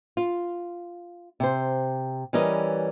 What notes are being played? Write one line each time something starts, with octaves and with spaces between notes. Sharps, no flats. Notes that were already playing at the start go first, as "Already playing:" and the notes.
F4
C3 C5
E3 G3 C#4 A#4 B4 D#5